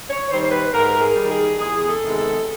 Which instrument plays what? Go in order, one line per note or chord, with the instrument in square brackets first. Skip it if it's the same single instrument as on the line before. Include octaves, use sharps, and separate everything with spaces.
[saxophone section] C#5
D#3 C5
G3
C5
B4
G#2 A#4
G#4
D#3 G3
G#4
E2 G#4
A4
C3 D#3 G#3 B3
A4